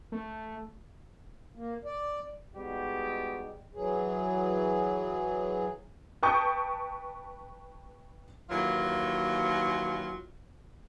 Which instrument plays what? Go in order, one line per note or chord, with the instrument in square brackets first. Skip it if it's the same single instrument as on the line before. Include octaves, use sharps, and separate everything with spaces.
[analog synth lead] A3
[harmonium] A#3
D5
[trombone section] G3 G#3 B3 D#4 F#4 G4
[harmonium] E3 F#3 G#4
[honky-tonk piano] B4 G5 A5 C#6 D#6 G6
[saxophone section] D#2 E3 F#3 F4